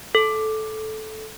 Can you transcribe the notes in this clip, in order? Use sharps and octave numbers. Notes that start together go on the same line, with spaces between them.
A4